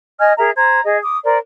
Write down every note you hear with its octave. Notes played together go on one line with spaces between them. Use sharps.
D#5 G#5 F6 G#6
G#4 A#4 E5 A#5
C5 A#5 G#6
G#4 D#5
D6 D#6
A#4 C5 D5